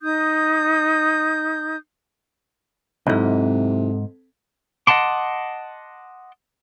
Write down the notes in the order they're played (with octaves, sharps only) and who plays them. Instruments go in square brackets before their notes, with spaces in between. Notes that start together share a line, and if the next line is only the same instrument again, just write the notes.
[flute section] D#4 D#6 G6
[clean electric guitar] C#2 G#2 [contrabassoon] C3 [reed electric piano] F#3 D#4 E4 [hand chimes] C4 A4
[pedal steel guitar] D#5 F#5 A5 C6 D6